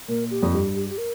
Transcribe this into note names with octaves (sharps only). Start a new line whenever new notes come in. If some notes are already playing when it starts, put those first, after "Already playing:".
A#2 A#4
G4
F2
G2 G4
G4
G4
A#4